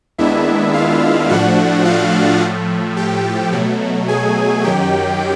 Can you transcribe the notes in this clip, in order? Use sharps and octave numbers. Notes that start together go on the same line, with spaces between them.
D#2 D#3 G#3 B3 D4 E4 E5
F4 F5
A2 F3 A3 D4 F#4 F#5
F4 F5
A2 F3 A3
G4 G5
B2 F#3 A3
G#4 G#5
F#2 D#3 F#3 G4 G5